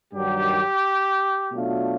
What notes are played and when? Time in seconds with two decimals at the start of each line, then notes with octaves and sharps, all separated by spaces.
0.13 G2 D#3 F#3 G4
1.52 B2 F#3 A3 D4 F4